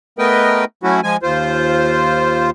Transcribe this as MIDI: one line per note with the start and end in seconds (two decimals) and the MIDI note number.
0.19 0.65 57
0.19 0.65 59
0.19 0.65 70
0.19 0.65 71
0.19 0.65 75
0.19 0.65 79
0.83 1.01 54
0.83 1.01 57
0.83 1.01 61
0.83 1.01 64
0.83 1.01 66
1.03 1.17 53
1.03 1.17 56
1.03 1.17 80
1.23 2.50 39
1.23 2.50 65
1.23 2.50 72